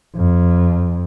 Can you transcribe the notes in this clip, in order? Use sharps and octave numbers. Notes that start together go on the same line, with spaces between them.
F2